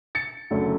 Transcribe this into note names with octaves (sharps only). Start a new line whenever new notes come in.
A6 C#7
F#1 F#2 D3 F#3 A3